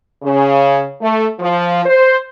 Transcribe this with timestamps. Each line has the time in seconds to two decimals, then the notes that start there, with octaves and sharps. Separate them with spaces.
0.23 C#3
1.01 A3
1.39 F3
1.86 C5